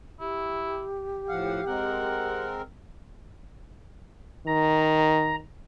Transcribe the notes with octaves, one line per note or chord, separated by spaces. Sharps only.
E4 G4
A2 F3 F5 F#5
G#3 C4 A#4 F#5
D#3 A#5